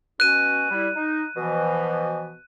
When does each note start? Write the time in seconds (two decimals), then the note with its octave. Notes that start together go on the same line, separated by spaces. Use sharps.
0.20 B2 C#4 F#4 F#6 D#7
0.70 G3 E4
0.95 D#4
1.36 B2 E3 F3